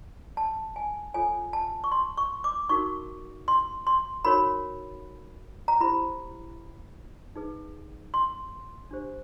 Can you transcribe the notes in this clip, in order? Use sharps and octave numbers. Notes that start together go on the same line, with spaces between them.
A5
G#5
F4 A4 C#5 G#5
A5
C#6
C6
C#6
D6
D#4 F#4 A#4 C#6
C6
C6
D#4 F#4 A#4 C#5 B5
A#5
E4 G4 C5 B5
D#4 G#4 B4
C6
D4 G4 C5